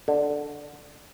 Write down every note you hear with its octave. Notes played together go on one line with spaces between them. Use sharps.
D3